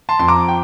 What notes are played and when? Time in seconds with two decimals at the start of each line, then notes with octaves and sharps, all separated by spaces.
0.09 A5 C6
0.19 F2 C6
0.28 A#5 D6
0.48 G5